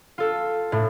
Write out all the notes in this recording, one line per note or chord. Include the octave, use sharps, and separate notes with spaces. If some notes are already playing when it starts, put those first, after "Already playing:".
F4 A4
A2